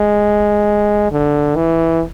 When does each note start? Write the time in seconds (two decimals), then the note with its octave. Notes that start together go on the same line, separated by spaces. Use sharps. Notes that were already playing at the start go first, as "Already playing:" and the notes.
Already playing: G#3
1.12 D3
1.56 E3